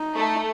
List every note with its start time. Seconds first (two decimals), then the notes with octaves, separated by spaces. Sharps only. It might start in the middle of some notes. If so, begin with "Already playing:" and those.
Already playing: D#4
0.16 A3